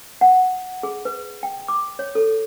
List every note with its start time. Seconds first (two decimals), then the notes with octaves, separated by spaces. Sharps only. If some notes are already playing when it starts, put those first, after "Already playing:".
0.21 F#5
0.83 G#4
1.05 B4
1.43 G5
1.68 D6
1.99 C#5
2.15 A4